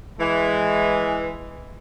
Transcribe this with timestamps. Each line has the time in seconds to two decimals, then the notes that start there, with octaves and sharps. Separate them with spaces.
0.19 E3 G#3